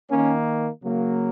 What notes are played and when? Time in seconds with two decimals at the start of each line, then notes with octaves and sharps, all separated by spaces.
0.11 D#3 A#3 C#4
0.83 C#3 F#3 A#3